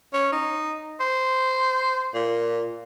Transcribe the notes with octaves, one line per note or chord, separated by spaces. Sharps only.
C#4
D#4
C5
A#2